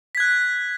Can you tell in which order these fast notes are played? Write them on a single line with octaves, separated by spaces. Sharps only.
B6 G#6 F#6